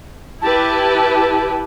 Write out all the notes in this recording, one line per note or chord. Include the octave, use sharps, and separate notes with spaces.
E4 G4 B4 A5